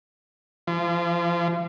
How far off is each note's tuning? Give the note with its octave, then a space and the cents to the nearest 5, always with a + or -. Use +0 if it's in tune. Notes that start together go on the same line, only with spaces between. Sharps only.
F3 -35